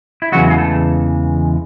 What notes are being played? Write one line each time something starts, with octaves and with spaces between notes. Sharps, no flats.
E4
E2 C#3 E3 F#3 G#3 F#4
G#4
A3 A4